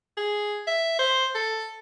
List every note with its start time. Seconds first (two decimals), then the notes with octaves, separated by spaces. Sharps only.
0.17 G#4
0.67 E5
0.99 C5
1.35 A4